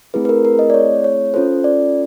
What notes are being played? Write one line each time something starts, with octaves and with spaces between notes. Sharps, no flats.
A3 C4 E4 G#4 B4
B4
A#4
A#4
D#5
D5
C#5
C#5
C#4 F4 A4 C5
D5